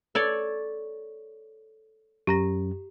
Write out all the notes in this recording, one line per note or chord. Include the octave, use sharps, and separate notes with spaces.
A4 C#5 D5
F#2 G4 A#5 A#6